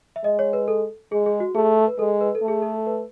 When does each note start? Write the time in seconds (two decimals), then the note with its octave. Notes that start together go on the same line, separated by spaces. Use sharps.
0.16 E5
0.24 G#3 D#5
0.39 C#5
0.53 B4
0.68 A4
1.12 G#3 G#4
1.26 G#4
1.40 F#4
1.55 A3 G#4
1.88 B4
1.99 G#3 A4
2.21 B4
2.35 A4
2.42 A3
2.48 G#4
2.62 A4
2.86 B4